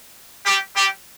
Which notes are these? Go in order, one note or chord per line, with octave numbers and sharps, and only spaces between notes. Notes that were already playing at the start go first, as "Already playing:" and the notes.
G3 G4
G3 G4